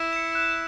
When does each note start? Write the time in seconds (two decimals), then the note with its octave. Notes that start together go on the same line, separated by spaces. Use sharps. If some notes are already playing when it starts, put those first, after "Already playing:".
Already playing: E4
0.13 C#7 E7
0.35 F#6